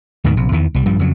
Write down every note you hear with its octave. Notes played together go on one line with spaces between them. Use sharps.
D2 G#2 B2 D#3
A#1 C3
E2 D#3 E3
C2 G3
A#1 G2 F3 G3
F2 C#3 F#3